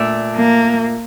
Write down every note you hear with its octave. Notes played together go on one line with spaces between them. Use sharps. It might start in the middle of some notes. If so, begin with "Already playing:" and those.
Already playing: A#2 A3 D4
A#3